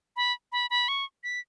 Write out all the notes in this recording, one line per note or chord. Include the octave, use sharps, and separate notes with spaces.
B5
B5
B5
C#6
B6